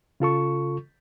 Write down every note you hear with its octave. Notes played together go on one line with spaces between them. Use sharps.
C#3 F4 A4 C#6